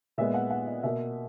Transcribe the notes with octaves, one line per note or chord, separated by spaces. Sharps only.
A#2 G#3 B3 E5
F#5
F#5
D#5
B2 A#3 E5